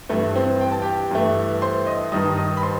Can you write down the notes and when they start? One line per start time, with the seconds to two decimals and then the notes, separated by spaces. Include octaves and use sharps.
0.09 G2 E3 G3 A3 A4
0.35 C4 C5
0.61 G5
0.72 A5
0.82 G4 G5
1.11 G2 E3 A3
1.62 C5 C6
1.87 D#5 D#6
2.12 G2 D#3 G3 D#5 D#6
2.37 D#5 D#6
2.57 B5
2.63 C5 C6